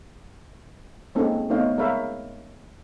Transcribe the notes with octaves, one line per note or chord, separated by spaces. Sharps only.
G#3 A#3 C4 C#4 D#4 A4
A3 B3 C4 D#4 C#5 F5
G#3 A#4 C#5 E5 F5 B5